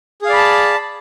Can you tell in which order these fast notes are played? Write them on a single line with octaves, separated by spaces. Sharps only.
G#4 F5 D5 B5 A5